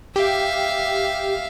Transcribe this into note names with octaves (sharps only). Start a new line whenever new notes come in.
G4 E5 F5